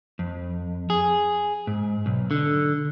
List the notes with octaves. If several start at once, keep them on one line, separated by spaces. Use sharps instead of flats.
F2
G#4
G#2
B1
D3